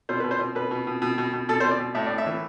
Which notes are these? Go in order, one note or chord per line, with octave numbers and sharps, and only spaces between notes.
B2 C5
B2 B4
C5
B2
B2 B4
B2
B2
B2
B2
B2
B2 A4
C5
B2
D5
B2
A2 E5
A2 D5
E5
E3